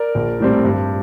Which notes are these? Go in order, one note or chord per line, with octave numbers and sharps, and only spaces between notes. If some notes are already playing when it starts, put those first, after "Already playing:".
Already playing: A#4 D5
A#1
A2 G3 C4
G2